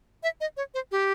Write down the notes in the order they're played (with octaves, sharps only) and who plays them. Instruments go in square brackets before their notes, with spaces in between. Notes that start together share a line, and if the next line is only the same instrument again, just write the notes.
[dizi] E5
D#5
C#5
C5
G4